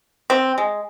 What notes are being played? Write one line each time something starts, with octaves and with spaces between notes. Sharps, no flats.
C4
G#3